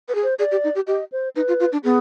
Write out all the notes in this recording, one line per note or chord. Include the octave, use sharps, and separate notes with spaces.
B4
G#4
C5
G#4 D5
G4
D#4
G4
G4 D#5
C5
D#4 B4
F4
F4
D4
B3 G#4